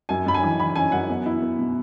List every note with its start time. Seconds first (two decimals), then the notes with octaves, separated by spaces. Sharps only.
0.09 F#2 G#5
0.26 F#2 B5
0.34 G#5
0.43 E3
0.59 E3 B5
0.76 C#4 G#5
0.92 F#2 F#5
1.09 B3
1.26 E4
1.42 B3
1.59 B2